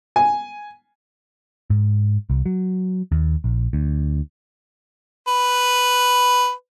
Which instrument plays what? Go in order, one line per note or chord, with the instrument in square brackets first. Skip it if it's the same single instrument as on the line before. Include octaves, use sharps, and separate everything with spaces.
[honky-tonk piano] G#5
[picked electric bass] G#2
C2
F#3
D#2
A#1
D2
[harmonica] B4